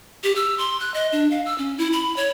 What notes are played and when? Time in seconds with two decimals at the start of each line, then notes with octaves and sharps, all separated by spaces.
0.23 G4
0.36 E6
0.58 C6
0.80 F#6
0.94 D#5
1.12 D4
1.31 F5
1.46 E6
1.58 C#4
1.78 E4
1.93 B5
2.16 C#5